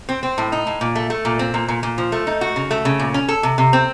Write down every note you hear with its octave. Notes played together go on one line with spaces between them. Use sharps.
C4
C4
A2
D#4
A2
A#2
A3
A3
A#2
C4
A#2
A#2
A#2
F3
A3
D#4
F#4
C#3
A3
C#3
A#2
C#4
A4
C3
C3
C4